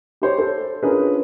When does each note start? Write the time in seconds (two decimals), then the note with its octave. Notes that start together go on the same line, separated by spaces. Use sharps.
0.22 G4 C5 C#5
0.38 A4
0.83 C#4 D4 F4 G#4 A#4 B4